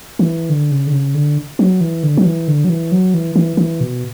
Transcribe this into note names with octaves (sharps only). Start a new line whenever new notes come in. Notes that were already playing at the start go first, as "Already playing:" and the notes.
E3
D3
C#3
D3
C#3
D3
F#3
E3
D3
F#3
E3
D3
F#3
E3
F#3
E3
E3
E3
B2